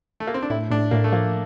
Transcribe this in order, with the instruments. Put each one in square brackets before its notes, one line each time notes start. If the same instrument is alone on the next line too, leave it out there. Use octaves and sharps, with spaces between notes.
[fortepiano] A3
A#3
C4
D4
[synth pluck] A2 [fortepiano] E4
[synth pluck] A2 [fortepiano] D4
[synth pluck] A2 [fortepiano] A#3
[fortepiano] A3
[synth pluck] F3 [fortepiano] A#3